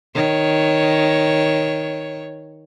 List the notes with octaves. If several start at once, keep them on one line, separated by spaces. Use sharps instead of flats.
D#3 C#5